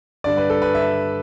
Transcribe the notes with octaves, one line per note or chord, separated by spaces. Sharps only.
G2 D3 G3 D5
B4
A4
B4
E5